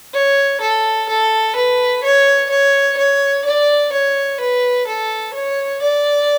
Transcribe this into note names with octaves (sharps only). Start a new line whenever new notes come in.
C#5
A4
A4
B4
C#5
C#5
C#5
D5
C#5
B4
A4
C#5
D5